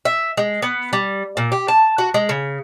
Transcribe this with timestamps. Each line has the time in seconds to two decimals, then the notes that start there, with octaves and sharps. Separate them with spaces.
0.05 E5
0.37 G#3
0.62 B3
0.93 G3
1.37 A#2
1.52 G4
1.68 A5
1.98 F#4
2.14 G#3
2.29 C#3